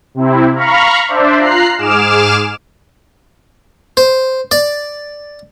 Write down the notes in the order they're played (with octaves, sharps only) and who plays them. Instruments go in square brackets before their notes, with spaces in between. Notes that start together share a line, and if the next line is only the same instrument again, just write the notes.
[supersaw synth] C3 C4 E4
F5 A#5 B5 C#6 F6
D4 C5 D5 E5
F4 A#5 F#6 C7
G#2 G#4 D6 F6 E7
[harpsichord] C5
D5